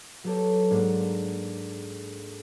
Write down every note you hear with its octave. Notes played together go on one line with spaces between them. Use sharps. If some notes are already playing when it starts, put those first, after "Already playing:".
F#3 B3 G4 A4 C#5
G#2 A#3 D4